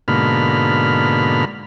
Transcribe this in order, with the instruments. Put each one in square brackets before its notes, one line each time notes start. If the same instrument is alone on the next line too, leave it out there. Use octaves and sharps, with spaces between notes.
[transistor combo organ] G#2 B2 D3 A#3 B5 F6